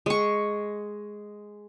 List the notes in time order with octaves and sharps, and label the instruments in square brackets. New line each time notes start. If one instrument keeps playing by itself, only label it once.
[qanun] G#3 C#6